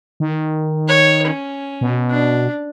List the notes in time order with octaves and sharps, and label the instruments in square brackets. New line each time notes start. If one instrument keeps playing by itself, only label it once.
[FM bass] D#3
[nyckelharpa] C#5
C#4
[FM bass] B2
[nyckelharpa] D4